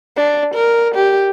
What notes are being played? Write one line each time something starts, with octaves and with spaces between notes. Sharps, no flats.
D4
A#4
G4